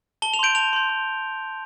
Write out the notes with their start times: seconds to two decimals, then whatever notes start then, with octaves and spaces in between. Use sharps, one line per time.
0.22 A5 G7
0.34 F7
0.39 C6 G6 D7
0.55 A5 F7
0.73 C6 G6
0.89 C6